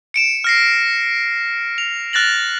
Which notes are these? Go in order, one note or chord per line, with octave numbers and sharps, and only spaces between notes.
C#7 D7 E7
F6 A#6 C7
F7
F6 F#6 A6 A#6 F#7